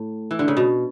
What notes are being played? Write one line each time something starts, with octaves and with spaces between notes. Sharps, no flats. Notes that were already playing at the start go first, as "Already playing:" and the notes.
Already playing: A2
E3
D3
C#3
B2